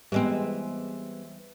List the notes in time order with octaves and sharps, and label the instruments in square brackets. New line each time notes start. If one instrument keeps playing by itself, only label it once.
[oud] E3 G#3 C4 [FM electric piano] G3 B3